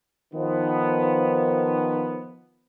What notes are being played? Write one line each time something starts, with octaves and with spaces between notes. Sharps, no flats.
D#3 F3 B3